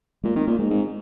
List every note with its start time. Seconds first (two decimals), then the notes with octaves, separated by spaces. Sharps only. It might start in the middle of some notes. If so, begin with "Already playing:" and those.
0.23 A#2 G#3
0.36 D#3 C4
0.47 A#2 A#3
0.58 G#2 G#3
0.70 G#2 C4